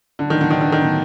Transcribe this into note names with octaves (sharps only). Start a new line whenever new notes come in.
A2 D3 F#3 B3 D4
D#3
D3
D#3
D3
D#3
D3